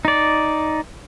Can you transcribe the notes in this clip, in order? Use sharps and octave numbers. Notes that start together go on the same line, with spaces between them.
D#4 D5